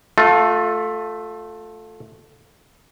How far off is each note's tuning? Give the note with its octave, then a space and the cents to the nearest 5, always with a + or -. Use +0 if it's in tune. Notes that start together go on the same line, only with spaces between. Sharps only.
A3 +0 F4 +25